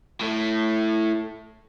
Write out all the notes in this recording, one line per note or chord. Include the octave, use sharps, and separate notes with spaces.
A2 A3